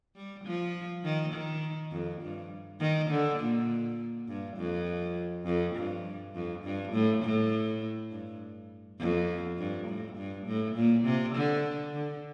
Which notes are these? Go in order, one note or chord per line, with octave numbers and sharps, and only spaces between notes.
G3
F3
D#3
D#3
F2
G2
D#3
D3
A#2
G2
F2
F2
G2
F2
G2
A2
A2
G2
F2
G2
A2
G2
A2
A#2
C3
D3
D3